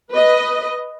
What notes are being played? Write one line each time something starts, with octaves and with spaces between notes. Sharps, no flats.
B4 D#5